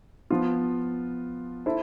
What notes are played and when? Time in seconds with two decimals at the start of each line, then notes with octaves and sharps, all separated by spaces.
0.30 F3 B3 F4
1.66 E4 A4 C5